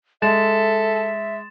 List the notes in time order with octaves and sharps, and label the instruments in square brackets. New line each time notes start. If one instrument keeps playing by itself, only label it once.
[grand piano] G#3 [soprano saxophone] A4 [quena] E5 [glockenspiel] A6 E7